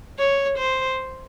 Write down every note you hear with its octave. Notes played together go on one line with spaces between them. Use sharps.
C#5
C5